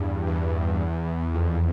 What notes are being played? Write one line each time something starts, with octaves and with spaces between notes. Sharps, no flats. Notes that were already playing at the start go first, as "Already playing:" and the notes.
Already playing: E2 G2
E2
F2